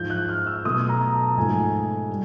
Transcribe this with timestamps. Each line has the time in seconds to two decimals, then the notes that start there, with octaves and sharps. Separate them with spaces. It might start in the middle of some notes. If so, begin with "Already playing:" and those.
Already playing: G#2 F3 G#3 G6
0.10 F#6
0.29 F6
0.47 E6
0.65 B2 F#3 A3 D#6
0.89 A#5
1.13 A5
1.37 G#2 F3 A3 G#5
2.09 G3